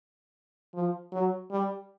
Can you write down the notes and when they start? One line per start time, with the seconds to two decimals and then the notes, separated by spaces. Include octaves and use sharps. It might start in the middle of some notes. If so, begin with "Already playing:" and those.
0.74 F3
1.12 F#3
1.51 G3